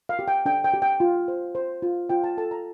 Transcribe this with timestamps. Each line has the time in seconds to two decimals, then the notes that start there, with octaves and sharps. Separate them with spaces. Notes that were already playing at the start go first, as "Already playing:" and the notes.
0.09 F5
0.19 G4
0.28 G5
0.46 D4 G5
0.64 G5
0.74 G4
0.82 G5
1.00 F4
1.28 C5
1.55 C5
1.82 F4
2.09 F4 G5
2.24 A5
2.38 A4 A5
2.51 A#5